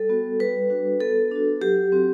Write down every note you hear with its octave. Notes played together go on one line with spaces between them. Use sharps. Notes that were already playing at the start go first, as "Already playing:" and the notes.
Already playing: G3 A4
B3 F#4
G3 B4
D4 F#4
B3 A4
D4 F#4
F#3 G4
C4 F#4